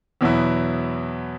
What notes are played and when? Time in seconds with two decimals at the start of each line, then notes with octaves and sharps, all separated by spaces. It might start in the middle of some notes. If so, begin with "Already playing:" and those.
0.21 E2 B2 F#3 B3 E4